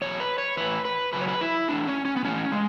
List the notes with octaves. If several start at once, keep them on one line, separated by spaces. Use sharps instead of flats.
E2 B2 F#3 C#5
B4
C#5
A2 E3 B4
B4
F#2 C#3 F#3 B4
C#5
B4
E4
A2 E3 D4
C#4
C#4
B3
A2 E3 C#4
G#3